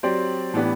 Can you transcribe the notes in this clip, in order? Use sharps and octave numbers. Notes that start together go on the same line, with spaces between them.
F#3 C4 G4 D5
A2 E3 B3 D4 G4